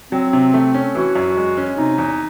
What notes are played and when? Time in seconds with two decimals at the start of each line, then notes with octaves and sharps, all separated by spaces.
0.12 F#3 C4
0.33 C3
0.54 A3
0.74 C#4
0.95 E3 F#4
1.16 F#2
1.37 G#3
1.57 C#4
1.77 C3 D#4
1.98 E2